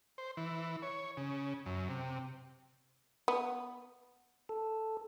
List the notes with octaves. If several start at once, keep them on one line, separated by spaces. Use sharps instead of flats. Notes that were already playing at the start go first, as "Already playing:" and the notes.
C5
E3
C#5
C#3
F#2
C3
B3
A4